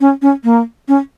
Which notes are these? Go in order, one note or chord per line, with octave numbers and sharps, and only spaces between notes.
C#4
C#4
A#3
C#4